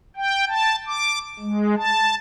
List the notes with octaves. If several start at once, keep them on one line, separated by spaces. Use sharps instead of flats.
G5
A5
D6
G#3
A5